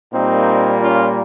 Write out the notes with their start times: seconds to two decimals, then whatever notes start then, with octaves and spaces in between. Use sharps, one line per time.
0.12 A#2 G3 A#3 C4 D#4
0.81 C#4 F4